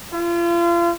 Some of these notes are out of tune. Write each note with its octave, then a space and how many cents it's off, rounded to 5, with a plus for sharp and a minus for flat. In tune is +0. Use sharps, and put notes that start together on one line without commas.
F4 -35